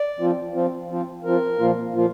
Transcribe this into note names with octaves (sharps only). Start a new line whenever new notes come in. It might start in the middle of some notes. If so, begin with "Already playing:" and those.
Already playing: D5
F3 C4 F4
F3 C4 F4
F3 C4 F4
F3 C4 F4 A#4
A#2 F3 A#3 F4
A#2 F3 A#3 F4